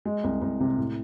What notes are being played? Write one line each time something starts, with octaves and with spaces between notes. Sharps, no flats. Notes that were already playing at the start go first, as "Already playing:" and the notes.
G#3
C2
C2
C3
A2